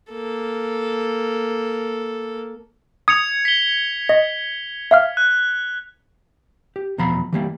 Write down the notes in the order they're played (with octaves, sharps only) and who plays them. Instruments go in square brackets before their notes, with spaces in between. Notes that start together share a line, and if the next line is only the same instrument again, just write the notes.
[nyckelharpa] A#3 A4
[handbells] D#6 [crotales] G#6 C#7 F7
[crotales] B6 G7
[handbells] D#5
E5 F5 F6
[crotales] F#6
[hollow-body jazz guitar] G4
E2 B2 F3 A#5 B5
E3 G3 A#3